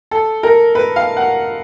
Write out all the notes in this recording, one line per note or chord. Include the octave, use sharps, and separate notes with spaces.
A4
A#4
B4
F5
F#5